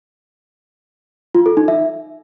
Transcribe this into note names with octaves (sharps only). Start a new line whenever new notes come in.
F4
A4
D#4
E5